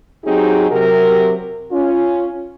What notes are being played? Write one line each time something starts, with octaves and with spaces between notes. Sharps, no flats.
F#3 C4 D#4 G4 G#4
C3 F#3 A#4
C#4 F4